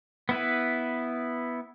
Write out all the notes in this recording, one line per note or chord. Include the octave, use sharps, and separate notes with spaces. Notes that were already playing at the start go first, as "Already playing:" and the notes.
B3 E4 B4